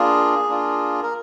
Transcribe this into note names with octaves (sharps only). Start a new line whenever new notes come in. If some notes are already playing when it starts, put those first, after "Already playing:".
Already playing: A#3 D4 F4 G#4
A#3 D4 F4
A#4